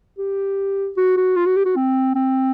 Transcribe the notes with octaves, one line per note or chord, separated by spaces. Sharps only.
G4
F#4
F#4
F4
F#4
G4
F#4
C4
C4